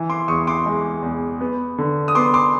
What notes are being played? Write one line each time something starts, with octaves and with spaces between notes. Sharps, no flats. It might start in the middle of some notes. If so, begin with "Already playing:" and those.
Already playing: E3
C6 D6
E2 C#6 D#6
C6 D6
G#3
E2
B3
D3
D#6
B3 C6 D6
C6 D6